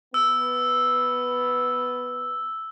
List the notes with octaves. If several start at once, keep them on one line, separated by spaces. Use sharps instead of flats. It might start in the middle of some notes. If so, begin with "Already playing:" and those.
B3 E6